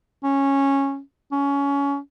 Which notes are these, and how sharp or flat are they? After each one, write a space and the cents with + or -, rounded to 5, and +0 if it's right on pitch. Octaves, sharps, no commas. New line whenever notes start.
C#4 -10
C#4 +20